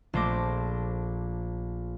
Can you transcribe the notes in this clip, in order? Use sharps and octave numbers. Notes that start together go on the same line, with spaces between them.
A#1 A3 C5 D6 A#6